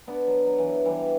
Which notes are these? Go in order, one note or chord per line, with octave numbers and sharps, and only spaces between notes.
B3 D4
F#3
F#3
E3
F#3
E3 G3